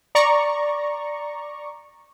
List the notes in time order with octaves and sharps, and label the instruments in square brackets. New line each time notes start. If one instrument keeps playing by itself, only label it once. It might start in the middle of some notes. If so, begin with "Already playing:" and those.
[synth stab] D5 A#5 C#6